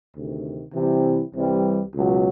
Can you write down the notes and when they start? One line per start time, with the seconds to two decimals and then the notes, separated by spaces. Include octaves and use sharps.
0.15 D2 C3 D#3
0.74 C3 E3 G3 C4 E4
1.35 C2 C3 E3 G3
1.94 C#2 B2 F#3